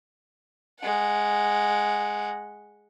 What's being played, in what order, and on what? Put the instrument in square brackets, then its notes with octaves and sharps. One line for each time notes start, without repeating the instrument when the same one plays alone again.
[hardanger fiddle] G#3 F#5